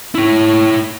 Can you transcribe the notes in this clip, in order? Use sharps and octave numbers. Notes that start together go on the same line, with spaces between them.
E4 C#5